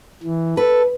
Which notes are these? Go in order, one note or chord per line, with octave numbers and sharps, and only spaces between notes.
E3
A4 B4